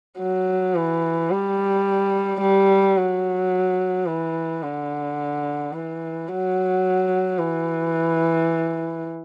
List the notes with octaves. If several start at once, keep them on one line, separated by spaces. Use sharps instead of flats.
F#3
E3
G3
G3
F#3
E3
D3
E3
F#3
E3